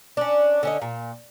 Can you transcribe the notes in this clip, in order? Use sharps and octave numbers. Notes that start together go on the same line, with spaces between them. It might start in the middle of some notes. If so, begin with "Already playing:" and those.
C#4 D4
D3 C#4 D#5
A#2